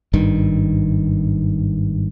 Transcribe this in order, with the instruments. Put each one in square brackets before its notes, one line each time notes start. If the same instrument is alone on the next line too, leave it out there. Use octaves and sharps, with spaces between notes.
[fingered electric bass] G#1 G2 D#3